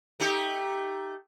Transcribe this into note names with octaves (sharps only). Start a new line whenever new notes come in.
A3 D#4 G4